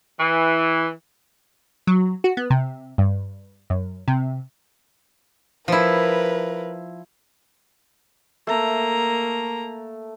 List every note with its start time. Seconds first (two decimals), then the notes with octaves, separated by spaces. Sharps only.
0.20 E3
1.87 F#3
2.24 F#4
2.37 B3
2.50 C3
2.98 G2
3.70 F#2
4.08 C3
5.68 F3 E4 A#4 B4
8.47 A3 A#3 A#5